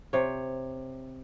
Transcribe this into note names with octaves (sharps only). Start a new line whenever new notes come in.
C3 C#5